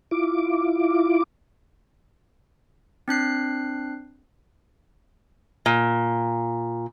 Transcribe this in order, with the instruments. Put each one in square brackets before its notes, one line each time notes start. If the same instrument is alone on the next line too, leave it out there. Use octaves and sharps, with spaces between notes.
[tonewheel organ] E4 F4 D6
[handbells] C4 D4 F#6 C7
[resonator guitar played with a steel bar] A#2